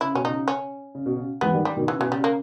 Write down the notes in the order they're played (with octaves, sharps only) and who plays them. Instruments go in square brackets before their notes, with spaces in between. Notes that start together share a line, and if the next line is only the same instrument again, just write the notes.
[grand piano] C#3 [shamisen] E4
[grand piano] B2 [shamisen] C#4
[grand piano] C#3 [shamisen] D#4
[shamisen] C#4
[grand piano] C#3
B2
C#3
[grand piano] E3 G#3 [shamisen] B3
[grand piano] D#3 G3
[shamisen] G3
[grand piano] B2 D#3
[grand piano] C#3 [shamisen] E3
[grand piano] B2 [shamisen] E3
[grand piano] C#3 [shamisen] G3
[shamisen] A#3